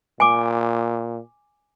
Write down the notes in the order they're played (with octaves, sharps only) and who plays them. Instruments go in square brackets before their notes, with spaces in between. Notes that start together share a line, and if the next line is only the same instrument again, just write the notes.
[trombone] A#2 [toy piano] G#5 D6